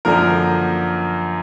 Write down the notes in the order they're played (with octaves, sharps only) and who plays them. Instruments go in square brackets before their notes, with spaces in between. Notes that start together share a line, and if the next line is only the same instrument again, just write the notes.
[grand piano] F#2 D3 F3 A#3 A#4